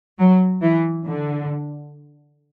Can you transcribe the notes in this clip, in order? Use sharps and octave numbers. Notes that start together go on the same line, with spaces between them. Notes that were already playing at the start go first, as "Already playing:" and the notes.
F#3
E3
D3